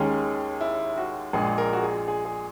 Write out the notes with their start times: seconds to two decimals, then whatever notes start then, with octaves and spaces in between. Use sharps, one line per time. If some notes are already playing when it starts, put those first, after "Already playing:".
Already playing: D#2 D#3 G#3 C#4 G#4
0.61 E4
0.97 F#4
1.33 A#1 A#2 G#3 G#4
1.58 A#4
1.73 F#4
1.83 G#4
2.08 G#4
2.25 G#4